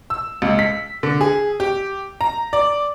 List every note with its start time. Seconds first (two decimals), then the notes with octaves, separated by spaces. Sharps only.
0.10 E6
0.42 C#2
0.59 B6
1.03 D3
1.21 G#4
1.60 G4
2.21 A#5
2.53 D5